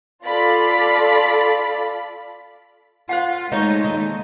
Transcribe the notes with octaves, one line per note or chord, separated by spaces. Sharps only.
F4 A4 D5 F5 B5 B6
F4 C5 F5 F#5
G#3 A3 D#4 C#5
D#2 D#4